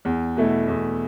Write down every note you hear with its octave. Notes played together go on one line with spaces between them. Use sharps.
E2
B2 A3 E4
E2